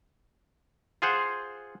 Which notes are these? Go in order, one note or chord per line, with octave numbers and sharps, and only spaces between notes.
F4 G#4 C5 F#5